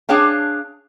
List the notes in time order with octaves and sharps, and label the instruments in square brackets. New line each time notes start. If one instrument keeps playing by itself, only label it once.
[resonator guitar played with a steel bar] D4 G#4 C#5 F5 G5